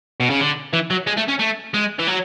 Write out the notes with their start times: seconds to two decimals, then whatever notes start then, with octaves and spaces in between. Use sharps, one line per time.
0.20 B2
0.30 C#3
0.41 D3
0.73 E3
0.90 F#3
1.07 G#3
1.17 A3
1.29 C#4
1.40 A3
1.74 G#3
1.99 E3
2.07 F#3